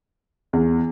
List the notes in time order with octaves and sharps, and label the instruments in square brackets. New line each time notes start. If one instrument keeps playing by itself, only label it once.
[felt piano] E2